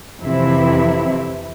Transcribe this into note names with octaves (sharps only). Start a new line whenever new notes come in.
F2 C3 E3 C4 E4